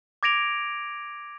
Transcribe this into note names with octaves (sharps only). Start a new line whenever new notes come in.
D6 G#6 A#6 D7 F7